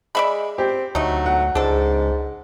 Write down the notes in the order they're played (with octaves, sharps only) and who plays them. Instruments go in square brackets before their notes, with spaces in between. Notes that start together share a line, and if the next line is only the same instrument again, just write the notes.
[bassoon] G#3 [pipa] D5 E5 B5
[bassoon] C4 [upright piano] G4
[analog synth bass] D2 [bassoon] F#3 [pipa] A3 D#4
[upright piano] F#5
[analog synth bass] C#2 [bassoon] G#2 [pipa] D4 A4